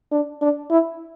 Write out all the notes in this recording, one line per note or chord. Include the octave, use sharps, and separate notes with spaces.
D4
D4
E4